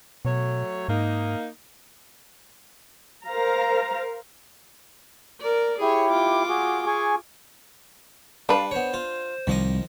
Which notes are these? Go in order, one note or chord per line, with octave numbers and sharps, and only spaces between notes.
B2 F#3 A3 C#5
G#2 A#3 D#4
A#4 C5 F5 A#5
A#4 D5
E4 G4 G#4 C#5
F4 D6
F#4 G#4
G#4 G#5 C#6
G3 D4 B4 F5
B3 C5 C#5
F4
C2 D#3 F3 D#5